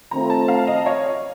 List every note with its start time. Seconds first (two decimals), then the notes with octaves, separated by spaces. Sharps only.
0.11 D#3 A3 C4 F4 A#5
0.30 A5
0.48 F5
0.67 D#5
0.86 C#5
1.06 C#5